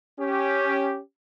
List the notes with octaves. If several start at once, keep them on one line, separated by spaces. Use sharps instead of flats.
C#4 G4